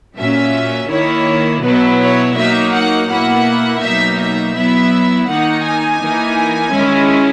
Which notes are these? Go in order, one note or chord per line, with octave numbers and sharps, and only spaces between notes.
A#2 F#3 C#4 E5
D#3 A#3 E4 C#5
B2 F#3 B3 E4 B4
C#5
F#3 A#3 D#4 E5
F#5
B2 A#3 E4 F#5
B2 F#3 A#3 D#4 E5
E5
F#3 B3 E4 E5
D#3 A#3 D#4 F#5
G#5
E3 A#3 D#4
D#3 G#3 C#4 E4